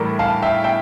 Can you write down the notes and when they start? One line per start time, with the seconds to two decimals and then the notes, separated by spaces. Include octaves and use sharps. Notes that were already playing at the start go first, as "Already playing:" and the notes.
Already playing: A2 E3 G3 A4 A#4
0.19 F5 A5
0.42 E5 G5
0.64 E5 G5